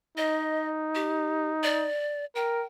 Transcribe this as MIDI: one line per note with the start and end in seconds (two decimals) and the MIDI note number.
0.17 1.88 63
0.17 0.68 75
0.95 1.51 67
1.63 2.25 74
2.36 2.64 70
2.36 2.65 79